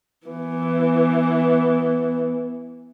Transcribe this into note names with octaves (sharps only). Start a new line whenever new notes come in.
E3 B3